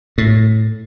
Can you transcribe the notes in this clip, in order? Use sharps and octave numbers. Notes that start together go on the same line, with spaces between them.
A2